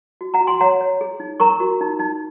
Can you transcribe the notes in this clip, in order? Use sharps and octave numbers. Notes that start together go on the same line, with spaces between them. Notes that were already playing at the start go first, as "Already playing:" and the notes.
F#4
F#5 A#5
F#4
G#5 C6
C#5 F#5 A#5
C#5
G#4
D#4
A#4 A#5 C#6
F#4
D#4
D#4